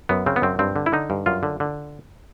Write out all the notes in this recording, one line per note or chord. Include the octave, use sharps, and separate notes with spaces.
F#2 B3
C#3 C4
B3
F#2 C4
G2 C4
D3
E4
D3 D#4
G2
F#2 F4
D3
D3